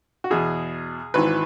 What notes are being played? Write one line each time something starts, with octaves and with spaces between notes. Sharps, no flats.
F#4
E2 B2 G#4
G#1 G#2 E3 B4